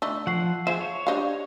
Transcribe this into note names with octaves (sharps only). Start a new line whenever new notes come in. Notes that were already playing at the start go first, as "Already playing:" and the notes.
D3 A3 D#4 C#6 E6
F3 F#5 C#6 C7
F3 G#4 C5 E5
C#5
D4 D#4 G4 C5 F5